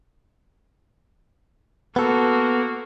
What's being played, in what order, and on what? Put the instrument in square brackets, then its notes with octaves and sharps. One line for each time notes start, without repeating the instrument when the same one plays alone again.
[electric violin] A#3 F#4 [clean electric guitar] B3 A4